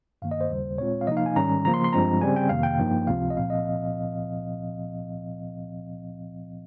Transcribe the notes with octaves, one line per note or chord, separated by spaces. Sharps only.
G2 D#3 A#3 F5
D#5
C5
D#2 C#3 G3
A#2 G#3 C4 F4 C#5
F5
C3 F3 A#3 D#4 D#5
F5
G#5
G#2 D#3 G3 C#4 A#5
C#3 F3 A#3 A#5
C6
C6
G2 F3 G#3 C4 A#5
C#3 G3 C4 G#5
G5
F2 C3 D#3 A#3 F5
G5
G2 F3 A#3 D#4
C#2 C3 F3 C4 F4 F5
D#5
A#2 F3 C4 F5
D#5